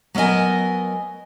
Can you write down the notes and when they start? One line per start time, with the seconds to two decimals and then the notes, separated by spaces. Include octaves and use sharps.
0.15 F#3 B3 A#4 D#5 G#5